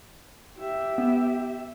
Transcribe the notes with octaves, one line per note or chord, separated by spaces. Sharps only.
G4 E5
B3